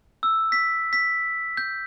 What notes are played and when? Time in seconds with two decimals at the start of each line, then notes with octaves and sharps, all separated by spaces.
0.23 E6
0.52 B6
0.93 B6
1.57 G6